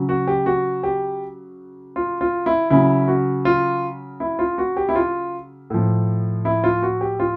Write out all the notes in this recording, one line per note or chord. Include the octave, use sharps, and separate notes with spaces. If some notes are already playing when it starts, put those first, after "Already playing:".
Already playing: C#3 F#3
F#4
G4
F#4
G4
F4
F4
E4
C#3 F#3 E4
F#4
F4
E4
F4
F#4
G4
E4
F4
A2 F3
E4
F4
F#4
G4
F4